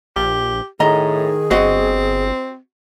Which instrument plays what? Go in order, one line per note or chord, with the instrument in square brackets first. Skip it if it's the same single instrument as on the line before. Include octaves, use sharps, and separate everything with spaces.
[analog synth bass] A#1 [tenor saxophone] G4
[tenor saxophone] A2 [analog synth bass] D#3 [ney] G#4 [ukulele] D#5 A#5
[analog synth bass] G1 [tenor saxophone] C4 [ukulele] F#4 D#5